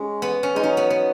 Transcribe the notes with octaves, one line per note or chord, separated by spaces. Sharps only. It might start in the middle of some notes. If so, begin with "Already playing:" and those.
Already playing: G#3 C#4
B3
C#4
G#3 D#4
F#3 C#4
B3
B3